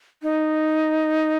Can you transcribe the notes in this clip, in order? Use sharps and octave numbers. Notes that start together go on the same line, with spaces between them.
D#4